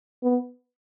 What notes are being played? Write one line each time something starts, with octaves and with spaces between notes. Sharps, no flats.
B3